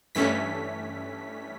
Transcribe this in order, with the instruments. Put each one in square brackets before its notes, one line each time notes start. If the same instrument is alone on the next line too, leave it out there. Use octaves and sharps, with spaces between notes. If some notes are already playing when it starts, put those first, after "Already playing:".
[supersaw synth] G2 E3 A3 C#4 B6